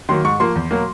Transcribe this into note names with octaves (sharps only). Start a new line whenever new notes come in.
D#3 F#3 A#3 C6
G#2 C#6
F3 A#3 C6
E2
B2 F#3 A#3